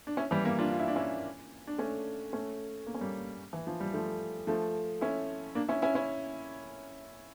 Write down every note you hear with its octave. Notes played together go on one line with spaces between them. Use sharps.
D4
C#4 E4
E3 G3
G3 A#3
D4 F4
F4
E4
D4
C#4 E4
D4
A3 C#4
A3 C#4
A#3
C#4
G3 A#3
E3
F3
G3
F3 A3
F3 A3
C#4 E4
A#3 D4
C#4 E4
C#4 E4
C#4 E4